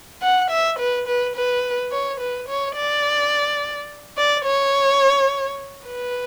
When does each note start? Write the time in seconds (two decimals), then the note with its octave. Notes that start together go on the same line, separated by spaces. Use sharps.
0.22 F#5
0.51 E5
0.79 B4
1.07 B4
1.36 B4
1.92 C#5
2.20 B4
2.48 C#5
2.76 D5
4.18 D5
4.45 C#5
5.87 B4